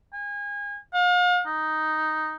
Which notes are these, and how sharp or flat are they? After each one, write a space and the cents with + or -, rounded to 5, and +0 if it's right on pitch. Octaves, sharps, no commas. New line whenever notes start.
G#5 -30
F5 +40
D#4 +0